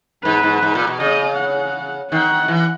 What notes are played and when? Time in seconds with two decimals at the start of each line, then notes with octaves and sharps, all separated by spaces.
0.24 G#2 B4
0.43 G#2
0.63 G#2
0.75 A#2
0.87 B2
1.00 C#3 D#5
1.37 F#5
2.11 D#3 F#5
2.48 E3